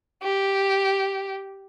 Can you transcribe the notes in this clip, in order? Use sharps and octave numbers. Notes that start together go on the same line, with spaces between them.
G4